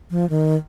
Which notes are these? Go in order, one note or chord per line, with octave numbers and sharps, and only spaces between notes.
F3
D#3